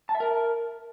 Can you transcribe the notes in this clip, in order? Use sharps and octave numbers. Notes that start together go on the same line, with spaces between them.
A5
E5
A#4